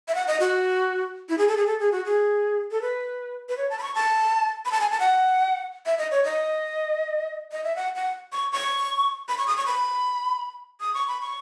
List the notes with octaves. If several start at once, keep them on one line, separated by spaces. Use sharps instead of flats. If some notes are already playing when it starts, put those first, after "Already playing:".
E5
F#5
D#5
F#4
E4
G#4
A4
G#4
A4
G#4
F#4
G#4
A4
B4
B4
C#5
A5
B5
C#6
A5
B5
A5
G#5
A5
F#5
E5
D#5
C#5
D#5
D#5
E5
F#5
F#5
C#6
C#6
B5
C#6
D#6
C#6
B5
D#6
C#6
B5
C#6